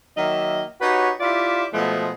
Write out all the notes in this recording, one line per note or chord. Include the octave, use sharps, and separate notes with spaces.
D#3 F#3 A#3 D#5 E5
D#4 F#4 G4 B4 C#5
E4 F4 G4 D5 E5
B2 F3 G#3 A3 B3